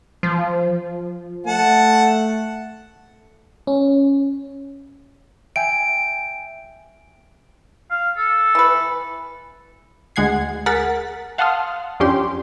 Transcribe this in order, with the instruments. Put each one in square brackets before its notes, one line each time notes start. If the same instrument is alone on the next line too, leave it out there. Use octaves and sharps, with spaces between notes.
[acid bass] F3
[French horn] A3 [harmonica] F#5 A5
[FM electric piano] C#4
[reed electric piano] E5 G5 G#5 [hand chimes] D7
[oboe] F5
A4
[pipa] E3 B4
[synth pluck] D2 G#3 F#5 G#6 C7
G#4 A#4 F#5 A6 B6
F5 F#5 A5 C6 D#6 F6
F2 C#4 D4 G4 C6